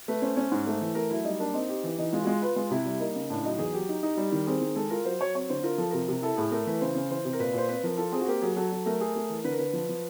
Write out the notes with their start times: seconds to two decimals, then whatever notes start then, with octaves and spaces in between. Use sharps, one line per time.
0.08 A3 B4
0.22 C#4 C5
0.37 C#4
0.51 G#2
0.67 A3
0.81 E3
0.95 A3 A#4
1.11 F#3 E4
1.25 G3 D#4
1.39 A#3 D4
1.54 C4 D#4
1.69 G4
1.83 E3
1.98 E3 D#4
2.13 G#3 F4
2.23 F#4
2.27 G#3 F4
2.42 F4 B4
2.56 G#3 F4
2.71 C3 E4
2.85 G3
3.00 A#3 D#4
3.15 C#3
3.30 A2 D4
3.45 F#3 D#4
3.59 E2 G#4
3.73 F#3 G4
3.89 D#4
4.03 D#4
4.17 G3
4.32 D#3
4.46 C4 G#4
4.61 D#3
4.76 G#3 A4
4.90 F4 A#4
5.05 F#3 C5
5.20 F#3 C#5
5.35 C4 C#5
5.49 D3 C5
5.63 F4 A#4
5.78 F3 A4
5.91 C3 A#4
6.08 C3
6.22 E4 A4
6.37 A2 G#4
6.51 A3 A#4
6.66 E3 B4
6.81 C#3 C5
6.95 C#3
7.10 E3 C5
7.25 C3
7.33 A#4
7.39 A#2 B4
7.54 A#2 C5
7.68 C4 B4
7.83 F3 A#4
7.98 F4 A4
8.12 C4 G#4
8.21 F#4
8.28 A#3 G4
8.41 F#3 G#4
8.56 F#3 A4
8.72 F#3
8.86 A3 A#4
9.01 G#4
9.16 A3
9.29 E3
9.44 D3 B4
9.52 A#4
9.58 D3 B4
9.73 F3
9.89 F3